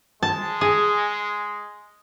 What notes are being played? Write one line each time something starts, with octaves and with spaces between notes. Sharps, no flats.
G#3 A5
G#4